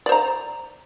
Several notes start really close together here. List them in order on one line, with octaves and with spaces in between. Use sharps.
D5 C5 A#5